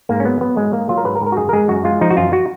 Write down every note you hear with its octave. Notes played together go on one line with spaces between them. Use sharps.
G#2 A#3
C#4
F#3 B3
F#3 B3
G#2 G#3
G#2 A#3
F#3 F4
A#4
G#2 B4
A#4
G#2
A#4
F#4
F#2 G#4
A#4
G#3 G#4
F#2 F#4
G#3 F4
F3 D#4
F#4
F#2 F4
F#4